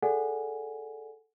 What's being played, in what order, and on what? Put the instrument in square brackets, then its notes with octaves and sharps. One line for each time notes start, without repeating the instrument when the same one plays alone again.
[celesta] G#4 A4 D5 F#5 G#5